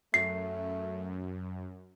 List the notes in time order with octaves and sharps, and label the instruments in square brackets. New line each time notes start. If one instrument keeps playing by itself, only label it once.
[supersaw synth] F#2 [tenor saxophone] A3 [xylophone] C7